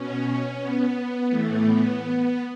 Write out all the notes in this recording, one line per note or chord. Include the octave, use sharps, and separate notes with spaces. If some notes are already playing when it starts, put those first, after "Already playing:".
Already playing: B2 C#4
B3
A2 E3 A3
B3